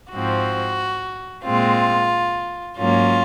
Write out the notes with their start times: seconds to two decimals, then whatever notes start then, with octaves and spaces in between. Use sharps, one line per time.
0.12 G#2 F3 C4 F#4
1.44 A#2 G#3 C4 F4
2.77 G#2 F#3 A#3 C#4 F4